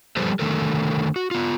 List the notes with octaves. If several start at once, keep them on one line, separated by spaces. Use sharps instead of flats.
F3 G3 G4 A4 B4 C5
D3 D#3 A3 A4 A#4
F#4
B3 F4